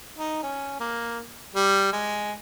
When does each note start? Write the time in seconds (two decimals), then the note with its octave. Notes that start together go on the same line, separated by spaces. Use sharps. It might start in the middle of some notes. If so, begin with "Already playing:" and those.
0.17 D#4
0.43 C#4
0.80 A#3
1.55 G3
1.93 G#3